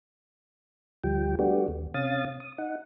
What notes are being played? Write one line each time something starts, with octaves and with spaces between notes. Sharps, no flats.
D2 F3 G3 G5
G3 A3 B3 D4 F#4 G4
D#2
C3 C#4 F5 D#6 A6
D#6
D#4 F#5